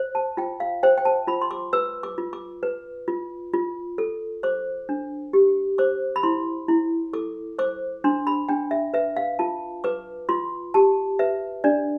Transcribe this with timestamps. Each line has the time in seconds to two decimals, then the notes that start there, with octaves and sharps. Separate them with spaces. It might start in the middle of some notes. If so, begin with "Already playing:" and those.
Already playing: C5
0.15 A5
0.37 F4 G5
0.60 F5
0.83 C5 G5
0.97 G5
1.05 A5
1.27 F4 B5
1.42 C6
1.51 D6
1.73 B4 E6
2.03 D6
2.18 F4
2.33 D6
2.63 B4
3.08 F4
3.53 F4
3.98 A4
4.43 C5 D6
4.89 D4
5.33 G4
5.78 C5 D6
6.16 B5
6.23 E4 C6
6.68 E4
7.13 A4 D6
7.59 C5 D6
8.04 D4 C6
8.27 B5
8.49 D4 G5
8.71 E5
8.94 B4 E5
9.17 F5
9.39 F4 A5
9.84 B4 D6
10.29 F4 C6
10.74 G4 A5
11.19 B4 E5
11.64 D4 D5